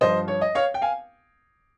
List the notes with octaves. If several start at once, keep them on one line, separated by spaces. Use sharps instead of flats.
G2 F3 C5 D#5
C#5
D#5
C#5 F5
G5
F5 G#5